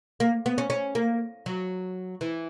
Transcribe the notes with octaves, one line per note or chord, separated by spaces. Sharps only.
A#3
B3
C#4
C#4
A#3
F#3
E3